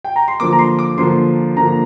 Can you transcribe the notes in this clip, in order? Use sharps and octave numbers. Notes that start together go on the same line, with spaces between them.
G5
A#5
C6
D3 F3 A#3 D6
A#5
C6
D6
D3 F3 A#3 C6
D3 F3 A#3 A#5